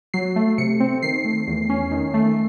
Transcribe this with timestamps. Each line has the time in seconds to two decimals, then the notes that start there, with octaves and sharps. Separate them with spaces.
0.14 F#3 C7
0.36 A3
0.58 C3 C#7
0.80 C4
1.02 D#3 C7
1.25 A3
1.47 E2
1.70 C#4
1.92 D#3
2.14 A3